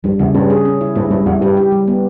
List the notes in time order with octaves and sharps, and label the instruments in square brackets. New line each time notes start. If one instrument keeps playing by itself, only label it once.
[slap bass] G2 [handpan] G3
[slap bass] E2 [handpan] C#3
[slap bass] G2 [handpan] C#4
[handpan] G#4
C#4
E4
[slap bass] G2 [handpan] E4
[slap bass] G2 [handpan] G3
[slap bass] E2 [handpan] E4
[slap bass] G2 [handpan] G4
[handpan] G4
G3
B3